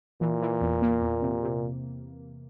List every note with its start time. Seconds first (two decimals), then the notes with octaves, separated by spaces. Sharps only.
0.21 A#2 E3
0.42 E3
0.61 E2
0.82 A#3
1.02 E2
1.22 C3
1.43 C3